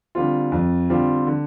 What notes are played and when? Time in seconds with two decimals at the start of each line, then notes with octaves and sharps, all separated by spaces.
0.15 D3 G3 C4 F4
0.52 F2
0.90 D3 G3 C4 F4
1.27 D3